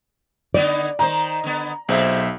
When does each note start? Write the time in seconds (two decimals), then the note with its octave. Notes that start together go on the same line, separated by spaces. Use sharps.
0.54 D3 B3 D#4 D5
0.99 D#3 D#4 C5 A#5
1.44 D3 B3
1.89 B1 A#2 C4 G#4 C5 E5